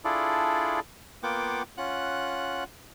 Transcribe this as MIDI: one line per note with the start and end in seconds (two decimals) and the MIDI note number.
0.05 0.80 62
0.05 0.80 64
0.05 0.80 65
0.05 0.80 68
0.05 0.80 69
0.05 0.80 74
1.23 1.63 58
1.23 1.63 59
1.23 1.63 65
1.23 1.63 78
1.23 1.63 79
1.23 1.63 86
1.78 2.64 61
1.78 2.64 65
1.78 2.64 78
1.78 2.64 90